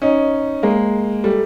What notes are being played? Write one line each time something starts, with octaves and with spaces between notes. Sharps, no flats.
C#4 D#4
G#3 A#3
G3 A3